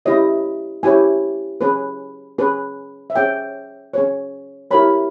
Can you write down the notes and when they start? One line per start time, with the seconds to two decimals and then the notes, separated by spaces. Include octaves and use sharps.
0.05 C#4 E4 G4 C#5 D#5
0.83 C#4 E4 G4 C#5 G#5
1.61 C#4 G#4 B4
2.38 C#4 G#4 B4
3.10 E5
3.15 C#4 G#4 C#5 G5
3.94 C#4 G#4 C#5
4.71 E4 G4 A#4 C#5 B5